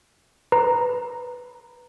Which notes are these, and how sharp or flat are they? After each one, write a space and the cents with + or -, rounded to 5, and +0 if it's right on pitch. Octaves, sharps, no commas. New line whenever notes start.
B4 +0 A#5 +0